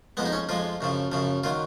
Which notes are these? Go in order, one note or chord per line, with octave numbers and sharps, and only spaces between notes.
F2 F3 G#3 B3
D#4
C#4
F2 F3 G#3 F4
F#2 C#3 F3
F#2 C#3 F3
D#3 F#3 F4